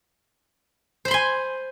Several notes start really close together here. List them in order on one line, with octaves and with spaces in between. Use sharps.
C5 B5 C6 G#5